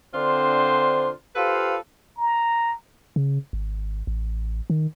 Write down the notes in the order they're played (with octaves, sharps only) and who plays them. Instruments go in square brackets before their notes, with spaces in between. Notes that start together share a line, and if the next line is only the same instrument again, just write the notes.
[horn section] D3 C4 D4 F4 C5
F4 G4 A4 B4 C5 F5
[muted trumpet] A#5
[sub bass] C#3
G#1
A1
D#3